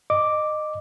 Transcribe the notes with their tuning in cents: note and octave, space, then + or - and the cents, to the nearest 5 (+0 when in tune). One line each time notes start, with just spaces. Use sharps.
D#5 -20 D6 +0